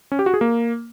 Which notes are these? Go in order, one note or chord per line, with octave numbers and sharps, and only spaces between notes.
C#4
G4
F#4
G#4
A#3